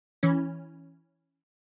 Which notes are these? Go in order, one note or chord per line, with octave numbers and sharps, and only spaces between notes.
E3 C#4